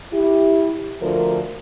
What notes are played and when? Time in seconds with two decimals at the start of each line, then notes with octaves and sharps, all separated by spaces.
0.13 E4 G4
1.01 D2 F3 A#4